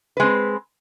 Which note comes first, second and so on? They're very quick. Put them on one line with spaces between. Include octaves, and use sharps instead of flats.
B4 G#3 C4